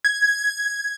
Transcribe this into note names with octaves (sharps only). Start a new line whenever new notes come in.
G#6